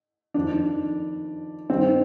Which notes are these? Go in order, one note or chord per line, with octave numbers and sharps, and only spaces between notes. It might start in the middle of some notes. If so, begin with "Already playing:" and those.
F2 D#3 D4
G2 D#3 C4